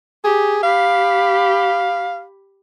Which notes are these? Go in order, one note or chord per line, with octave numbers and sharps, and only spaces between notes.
G4 G#4
G4 F5 B5